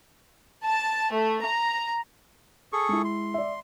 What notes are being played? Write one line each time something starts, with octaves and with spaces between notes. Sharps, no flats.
A5
A3
A#5
G#4 A4 C#6
G#3 E4
C6
D5 E5